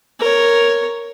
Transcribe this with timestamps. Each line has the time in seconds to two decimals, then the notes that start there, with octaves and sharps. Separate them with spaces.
0.20 A#4 C#5